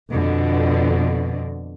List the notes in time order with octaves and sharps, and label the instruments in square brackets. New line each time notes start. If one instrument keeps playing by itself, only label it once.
[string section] F2 B2 D3